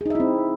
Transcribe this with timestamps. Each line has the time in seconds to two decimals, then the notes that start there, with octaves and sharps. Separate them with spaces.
0.01 G#4
0.06 D#4
0.10 E5
0.15 E4
0.20 C4